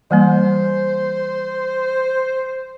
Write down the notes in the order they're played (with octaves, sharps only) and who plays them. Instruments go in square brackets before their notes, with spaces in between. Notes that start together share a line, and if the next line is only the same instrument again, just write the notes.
[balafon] E3 G3 A#3 [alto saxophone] C5